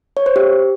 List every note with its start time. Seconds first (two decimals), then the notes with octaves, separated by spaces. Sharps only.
0.17 C#5
0.26 C5
0.36 G4